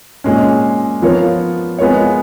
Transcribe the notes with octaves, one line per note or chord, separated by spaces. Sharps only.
A#2 G#3 C#4
F3 B3 F4 A#4 C#5
G#3 B3 F4 A#4 C#5